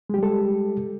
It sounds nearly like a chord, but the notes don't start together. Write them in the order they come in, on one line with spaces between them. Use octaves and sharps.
G#3 G4 G3 A4